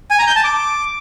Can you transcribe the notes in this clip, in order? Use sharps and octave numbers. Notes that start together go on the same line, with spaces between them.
G#5
A#5
G6
A5
D6